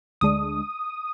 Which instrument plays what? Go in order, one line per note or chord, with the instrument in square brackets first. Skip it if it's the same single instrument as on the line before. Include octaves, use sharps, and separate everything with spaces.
[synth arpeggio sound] D2 D3 G#3 D4 D#6